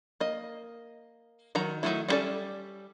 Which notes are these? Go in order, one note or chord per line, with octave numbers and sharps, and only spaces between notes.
A#3 D#5
D#3 F#3 A#5
D#3 E3 F#3 A3 E4
G3 B3 C#4 A4 D5